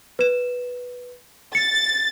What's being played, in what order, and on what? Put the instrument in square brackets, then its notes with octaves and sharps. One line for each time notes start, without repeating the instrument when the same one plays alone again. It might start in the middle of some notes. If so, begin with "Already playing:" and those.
[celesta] B4 E7
[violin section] A6 [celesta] C#7